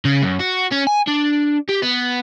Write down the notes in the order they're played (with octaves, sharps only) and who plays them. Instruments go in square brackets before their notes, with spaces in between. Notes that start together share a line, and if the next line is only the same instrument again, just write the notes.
[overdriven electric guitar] C#3
F#2
F#4
C#4
G#5
D4
G4
B3